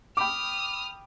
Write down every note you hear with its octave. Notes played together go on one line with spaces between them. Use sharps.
G5 B5 D6 D#6 F6